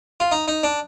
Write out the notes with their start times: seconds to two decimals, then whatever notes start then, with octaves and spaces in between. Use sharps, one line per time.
0.20 F4
0.32 D#4
0.48 D#4
0.63 D4